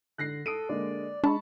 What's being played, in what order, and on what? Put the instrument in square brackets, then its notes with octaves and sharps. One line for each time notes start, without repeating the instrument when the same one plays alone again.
[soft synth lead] D3 [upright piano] F#6 A#6 C7
[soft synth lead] A4 [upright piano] D#6 D7 D#7
[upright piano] D3 G#3 A#3 [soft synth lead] D5
[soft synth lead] G#3 [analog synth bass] D4 [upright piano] A5 B5 C#6